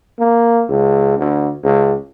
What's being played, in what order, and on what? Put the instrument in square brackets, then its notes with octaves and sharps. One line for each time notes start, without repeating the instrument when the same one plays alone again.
[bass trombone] A#3
C#2
D2
C#2